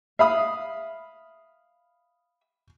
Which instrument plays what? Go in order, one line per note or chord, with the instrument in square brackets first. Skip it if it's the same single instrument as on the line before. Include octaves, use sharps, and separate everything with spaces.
[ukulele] E5 [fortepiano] F5 B5 D#6